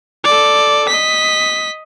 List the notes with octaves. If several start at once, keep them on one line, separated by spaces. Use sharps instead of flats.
A4 D5
D#5 B6